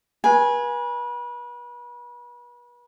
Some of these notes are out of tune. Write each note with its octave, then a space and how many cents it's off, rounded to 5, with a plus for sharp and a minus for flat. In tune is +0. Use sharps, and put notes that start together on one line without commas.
B4 -35 G#5 +0